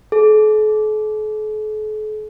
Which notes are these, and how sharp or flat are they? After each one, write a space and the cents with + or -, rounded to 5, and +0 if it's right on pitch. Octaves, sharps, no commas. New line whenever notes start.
A4 -45